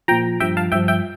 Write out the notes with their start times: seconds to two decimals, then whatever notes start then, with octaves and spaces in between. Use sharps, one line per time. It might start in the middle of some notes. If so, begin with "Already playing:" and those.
0.08 A#2 F3 G5 A#5
0.40 G2 F3 E5 G5
0.57 F5 A5
0.72 G2 E5 G5
0.75 F3
0.88 E5 G5